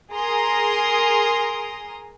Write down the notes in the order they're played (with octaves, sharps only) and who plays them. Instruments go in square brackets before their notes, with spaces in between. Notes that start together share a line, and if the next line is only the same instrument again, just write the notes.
[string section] G#4 A#4 A#5 C6 D#6